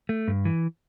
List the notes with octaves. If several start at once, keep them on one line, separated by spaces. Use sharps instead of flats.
A3
G2
E3